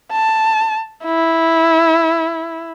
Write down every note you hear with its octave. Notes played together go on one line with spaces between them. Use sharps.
A5
E4